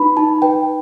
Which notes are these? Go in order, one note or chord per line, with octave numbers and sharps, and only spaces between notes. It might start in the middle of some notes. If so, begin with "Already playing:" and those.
Already playing: D#4 B4 B5
D#4 A5
B4 G5